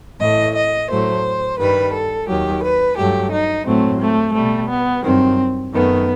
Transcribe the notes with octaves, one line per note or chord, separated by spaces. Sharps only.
A2 E3 A3 D#5
D#5
A2 F#3 A3 C5
G2 D#3 G3 B4
A4
D#2 D#3 F#3 G4
B4
G2 F#3 A3 G4
D#4
A2 F#3 A3 C4
A3
G3 A3
B2
B3
G2 D#3 F#3 C4
F#2 D#3 A3 B3